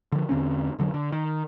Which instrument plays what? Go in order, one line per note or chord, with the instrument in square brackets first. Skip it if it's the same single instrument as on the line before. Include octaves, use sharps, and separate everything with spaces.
[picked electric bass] D3 F3
E2 D3 C4 C#4
F1 D3 F#3
D3
D#3